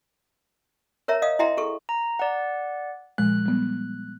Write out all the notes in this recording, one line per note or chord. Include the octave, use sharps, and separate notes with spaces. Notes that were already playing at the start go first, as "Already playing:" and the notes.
A#4 C#5 E5 A#5
D#5 F5 D#6
E4 D#5 E5 G5 A#5 C6
G#4 A4 C#6
A#5
D5 F#5
A#2 F3 G#3 F#6
G3 B3